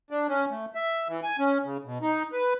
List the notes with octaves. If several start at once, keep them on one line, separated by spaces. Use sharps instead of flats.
D4
C#4
A3
E5
E3
G#5
C#4
C#3
B2
D#4
B4